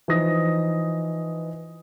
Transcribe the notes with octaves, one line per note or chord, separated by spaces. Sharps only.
E3 F3 D#4 D#6 A#6